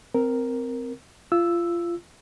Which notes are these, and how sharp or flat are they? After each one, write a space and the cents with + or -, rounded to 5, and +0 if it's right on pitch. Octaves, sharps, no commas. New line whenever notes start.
C4 -15 A#4 +0
F4 -25 E6 +0